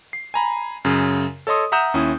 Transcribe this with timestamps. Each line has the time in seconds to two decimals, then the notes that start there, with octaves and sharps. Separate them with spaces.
0.13 C7
0.34 G#5 A#5 B5
0.85 F#2 C#3
1.47 A4 C#5 D#5 C6 D#6
1.72 E5 F#5 A#5 D#6 G6 E7
1.94 D#2 C#4 E4 D#6